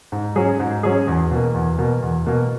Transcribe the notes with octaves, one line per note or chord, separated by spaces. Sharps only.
G#2
F#3 C#4 G#4
G#2
F#3 C#4 G#4
E2
B2 A#3
E2
B2 A#3
E2
B2 A#3